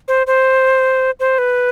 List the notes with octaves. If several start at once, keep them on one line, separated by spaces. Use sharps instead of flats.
C5
C5
C5
B4